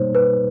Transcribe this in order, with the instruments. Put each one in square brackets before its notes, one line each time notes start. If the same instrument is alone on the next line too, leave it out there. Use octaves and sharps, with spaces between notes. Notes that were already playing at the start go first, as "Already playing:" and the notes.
Already playing: [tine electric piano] B2 G3 A#3 D#4 [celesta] C5 C#5
[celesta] B4